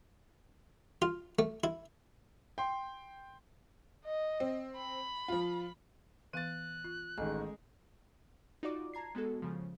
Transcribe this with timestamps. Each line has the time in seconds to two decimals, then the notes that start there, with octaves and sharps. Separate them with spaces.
1.02 F4
1.39 A3
1.64 E4
2.58 G5 C6
4.05 D#5
4.40 C4
4.77 B5
5.28 F3 F4
6.33 E3 B3 F5 F#6 A6 D#7
6.84 F4
7.18 A1 D#3 G#3 G#4 A4 D#5 G#5
8.63 D#4 F4 F#4 D5 D6
8.94 A5 A#5 G#6 C7
9.15 G#3 B3 F#4 A4
9.42 C#3 F3